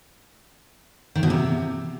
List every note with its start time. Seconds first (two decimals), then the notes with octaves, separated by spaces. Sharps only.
1.16 D#3
1.23 B2
1.30 C3